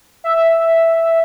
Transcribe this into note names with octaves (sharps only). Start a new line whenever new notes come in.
E5